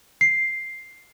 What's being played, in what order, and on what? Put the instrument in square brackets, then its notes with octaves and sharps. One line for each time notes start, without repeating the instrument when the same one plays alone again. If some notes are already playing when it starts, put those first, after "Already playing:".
[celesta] C7